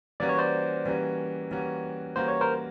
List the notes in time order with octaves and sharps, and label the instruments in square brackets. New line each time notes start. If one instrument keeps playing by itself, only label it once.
[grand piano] E3 G3 A#3 C#4 F#4 [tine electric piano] D5
[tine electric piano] C#5
C5 D5
[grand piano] E3 G3 A#3 C#4 F#4
E3 G3 A#3 C#4 F#4
[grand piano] E3 G3 A#3 C#4 F#4 [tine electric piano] C5
[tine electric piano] C#5
A#4 C5